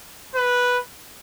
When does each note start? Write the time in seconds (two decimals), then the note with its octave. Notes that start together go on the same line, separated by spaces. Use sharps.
0.35 B4